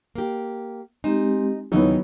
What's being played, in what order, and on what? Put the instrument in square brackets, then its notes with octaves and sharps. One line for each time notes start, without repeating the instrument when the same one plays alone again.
[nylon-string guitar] A#3 G4
[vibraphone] G#3 C4 G4 [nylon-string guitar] D#4
[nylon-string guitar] D#2 C#3 D#4 [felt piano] F#3 B3 [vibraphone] E4 C#5